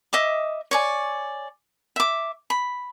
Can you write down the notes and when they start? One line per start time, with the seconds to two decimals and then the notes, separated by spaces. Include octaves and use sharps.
0.13 D#5 E5 D6
0.71 C#5 D5 G#5
1.96 E5 D6
2.50 B5